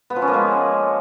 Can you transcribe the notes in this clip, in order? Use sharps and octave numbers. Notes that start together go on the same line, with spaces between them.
B3
F3
C#4
A#3
G#3